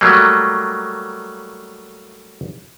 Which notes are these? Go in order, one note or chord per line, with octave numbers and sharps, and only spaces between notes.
F#3 G3 A3 A#3